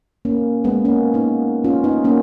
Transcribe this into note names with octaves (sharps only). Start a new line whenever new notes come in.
A#3 C#4
G#3 B3
A#3 C#4
B3 D#4
C#4 F4
B3 D#4
A#3 C#4